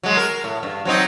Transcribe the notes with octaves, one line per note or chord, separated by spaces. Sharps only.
F#3 G#3
A#4
A2
G2
F#3 C4 D#4